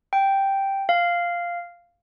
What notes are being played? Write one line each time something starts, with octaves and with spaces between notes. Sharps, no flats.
G5
F5